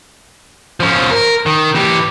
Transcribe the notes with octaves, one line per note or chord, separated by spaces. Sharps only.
F3 C#4
A#4
D#3
E3 G4